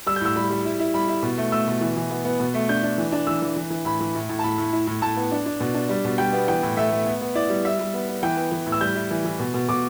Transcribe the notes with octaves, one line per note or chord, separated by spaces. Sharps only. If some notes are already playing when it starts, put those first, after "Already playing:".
G3 E6
G6
A2 E6
G3 B5
G3
E4
E4
G3 B5
E4
B2
A3
A3 E6
B2
E3
E3
B3
B3
B2
A3
D4 G6
D4
E3
D4
E3 E6
E3
E3
E3
A2 B5
E3
A2
A2
A5
A2 B5
A2
E4
A2
A2 A5
B3
D4
D4
B2
D4
G3
B2
G3 G5
B3
E3 G5
A2
A3 E5
A3
B3
B3
E4 D5
G3
G3 E5
G3
B3
B3
E3 G5
B3
E3
A2
E6
G3 G6
E4
E3
E3
B2
B2
B2 D6